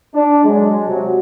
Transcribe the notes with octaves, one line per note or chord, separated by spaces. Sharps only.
D4
F#3 G#3
C3 F#3